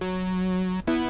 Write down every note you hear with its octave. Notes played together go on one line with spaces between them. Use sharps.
F#3
B3 E4